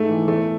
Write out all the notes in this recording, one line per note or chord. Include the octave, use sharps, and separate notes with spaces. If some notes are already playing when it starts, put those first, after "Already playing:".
Already playing: G#2 A3
E3
E2 A3